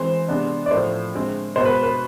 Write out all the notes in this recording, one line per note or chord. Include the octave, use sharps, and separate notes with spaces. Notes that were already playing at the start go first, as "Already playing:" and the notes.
Already playing: E3 G#3 C4 C5
C3 G#3 B3 D4
D5
A2 F3 A3 C5
D3 G#3 C4
B2 G#3 B3 C5
B4
B4